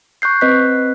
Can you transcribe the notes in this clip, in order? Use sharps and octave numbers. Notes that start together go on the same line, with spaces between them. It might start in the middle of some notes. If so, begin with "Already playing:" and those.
C#6 F#6 G6 C7
C4 B4 D#5 F#6 B6